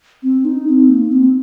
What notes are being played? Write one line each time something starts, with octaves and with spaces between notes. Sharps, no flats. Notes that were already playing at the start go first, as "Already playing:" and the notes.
C4
D#4
C4
A#3
C4